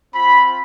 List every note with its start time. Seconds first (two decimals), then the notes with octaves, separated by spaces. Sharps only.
0.14 C4 F4 B5